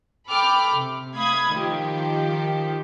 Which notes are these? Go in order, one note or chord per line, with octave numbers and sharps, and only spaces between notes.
A4 G5 B5 D6 F6
C3
A3 F5 B5 D#6 G#6
D#3 F3 G4